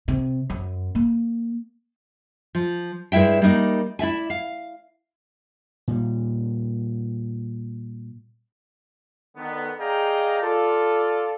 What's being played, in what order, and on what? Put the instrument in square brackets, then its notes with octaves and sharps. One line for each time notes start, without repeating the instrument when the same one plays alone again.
[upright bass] C3
F#2
A#3
[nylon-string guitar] F3
G2 G#3 E4 E5 G5
G3 A#3 B3 D#4
E4 D5 E5 G#5
F5
[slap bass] A#2 G3
[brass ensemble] D3 D#3 B3
G#4 D5 D#5 F5 G5 A#5
F4 A4 D5